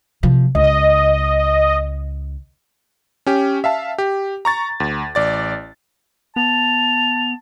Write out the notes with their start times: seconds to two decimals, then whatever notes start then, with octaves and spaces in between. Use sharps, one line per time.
0.23 C3 F3
0.55 C#2 D#5
3.26 C#4 G4
3.64 E5 F5 A5
3.98 G4
4.45 A#5 C#6 A6
4.80 D2
5.15 A1 D5 A6
6.36 B3 A5 F7